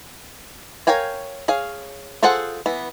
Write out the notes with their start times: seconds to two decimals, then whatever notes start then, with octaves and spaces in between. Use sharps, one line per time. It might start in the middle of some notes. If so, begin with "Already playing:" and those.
0.87 A#4 C#5 F5 G5 G#5
1.48 G#4 C#5 F5
2.23 F4 G#4 A4 C5 F#5
2.66 E3 B3